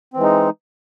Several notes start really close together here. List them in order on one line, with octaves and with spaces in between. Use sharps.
C4 E3 G#3 D#4